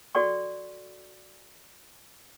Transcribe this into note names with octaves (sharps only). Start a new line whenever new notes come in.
F#4 A4 D5 G5 C#6